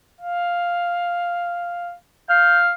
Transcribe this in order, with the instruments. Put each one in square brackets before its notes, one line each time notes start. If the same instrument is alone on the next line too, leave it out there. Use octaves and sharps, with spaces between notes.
[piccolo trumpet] F5
[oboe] F5 [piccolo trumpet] G6